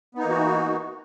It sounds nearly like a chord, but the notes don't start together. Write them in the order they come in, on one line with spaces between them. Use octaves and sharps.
B3 D#4 A#3 E3 F#4